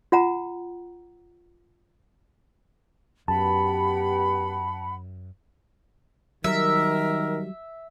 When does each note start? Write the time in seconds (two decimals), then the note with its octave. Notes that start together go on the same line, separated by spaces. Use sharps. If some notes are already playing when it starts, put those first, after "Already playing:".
0.12 F4 F#5 A#5
3.28 F#2 B3 G4 F#5 A5 B5
6.44 D#3 F#3 G3 A#4 E5